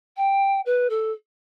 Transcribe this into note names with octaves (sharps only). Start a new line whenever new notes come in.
G5
B4
A4